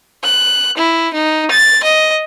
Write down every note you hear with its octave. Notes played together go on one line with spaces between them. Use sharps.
F#6
E4
D#4
A6
D#5